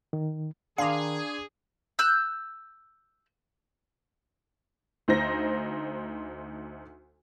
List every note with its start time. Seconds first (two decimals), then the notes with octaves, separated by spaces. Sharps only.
0.13 D#3
0.78 D#3 D4 G#4 F5 A#5 C6 D6
1.99 E6 F#6 G6
5.08 D2 D#4 C5 A#6